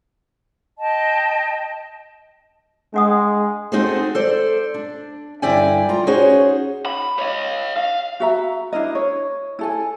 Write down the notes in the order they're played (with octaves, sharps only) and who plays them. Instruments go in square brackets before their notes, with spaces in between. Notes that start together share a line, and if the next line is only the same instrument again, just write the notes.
[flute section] D#5 G5 A5
[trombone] G#3 [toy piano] D4 F#5 D#6
[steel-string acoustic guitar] C4 D#4 F#4 G#4 A4 C5
A4 C5 D5
D4
G2 D3 E4 D5 G5 G#5
F4 A#5
C#4 D#4 F#4 G#4 C5 C#5
[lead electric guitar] B5
C#5 D#5
F5
[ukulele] F#4 E5 A#5
D4 E4 A#4 D#5
C#5
E4 A4 G#5